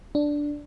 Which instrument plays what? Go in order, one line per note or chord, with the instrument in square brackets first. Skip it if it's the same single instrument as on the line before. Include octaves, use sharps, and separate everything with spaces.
[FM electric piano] D4